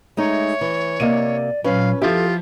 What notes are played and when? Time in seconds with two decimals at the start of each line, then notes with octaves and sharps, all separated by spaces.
0.17 G#3 A3 D#4 C#5
0.61 E3
1.00 C3 A#3 D5 D#5 D#7
1.64 A#2 F#3 C#4 B4 F5
2.02 F3 E4 F4 G4 A4